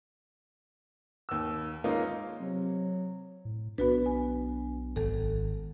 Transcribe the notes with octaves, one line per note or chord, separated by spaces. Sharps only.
D#2 E6
G#3 A#3 C#4 D#4 F4
C3 F#3
A2
B1 B3 D4 F#4 B4
G#5
G#1 A4